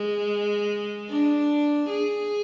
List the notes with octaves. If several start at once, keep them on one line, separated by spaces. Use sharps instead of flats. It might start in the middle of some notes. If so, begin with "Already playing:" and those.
Already playing: G#3
D4
G#4